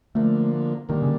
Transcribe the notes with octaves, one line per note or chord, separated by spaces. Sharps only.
D3 F3 A3 A#3
D3 D#3 G3 A#3
C#3